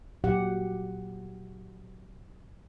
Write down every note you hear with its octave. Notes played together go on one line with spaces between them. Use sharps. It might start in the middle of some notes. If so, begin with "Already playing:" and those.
A#2 F#3 G4 F#5